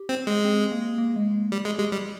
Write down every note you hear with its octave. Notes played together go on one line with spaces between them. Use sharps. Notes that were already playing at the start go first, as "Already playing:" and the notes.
Already playing: G4
C4
G#3
C4
A#3
A#3
G#3
G3
G#3
G#3 G4
G3